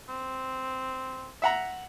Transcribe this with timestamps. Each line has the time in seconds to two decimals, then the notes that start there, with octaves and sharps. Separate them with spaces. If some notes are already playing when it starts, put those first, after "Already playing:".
0.09 C4
1.42 E5 F#5 A#5